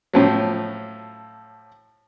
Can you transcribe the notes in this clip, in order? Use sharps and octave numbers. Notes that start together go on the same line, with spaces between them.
A2 F3 F#3